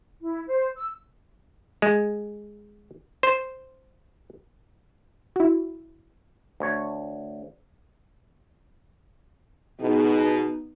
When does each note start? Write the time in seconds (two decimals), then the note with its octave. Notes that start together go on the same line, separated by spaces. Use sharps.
0.21 E4
0.47 C5
0.76 E6
1.82 G#3
3.23 C5
5.36 E4 F#4
6.60 D2 C#5
9.81 B2 B3 D#4 G#4